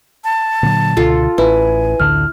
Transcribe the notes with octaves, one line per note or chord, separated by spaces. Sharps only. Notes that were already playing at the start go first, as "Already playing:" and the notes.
A5
A#2 D3 F#3
C#2 B2 D3 F4 A4 F5
A1 E4 B4 G#5
A1 D2 D3 F6